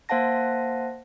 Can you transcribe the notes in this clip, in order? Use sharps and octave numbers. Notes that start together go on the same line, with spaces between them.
A#3 C5 F5 F#5 A5 A#6